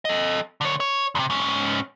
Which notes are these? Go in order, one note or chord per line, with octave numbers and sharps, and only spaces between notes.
A4 D#5
D3 C#5
C#5
E2 C3
G#2 C#4